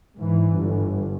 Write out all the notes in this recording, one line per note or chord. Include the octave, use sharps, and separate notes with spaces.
G#2 E3
G1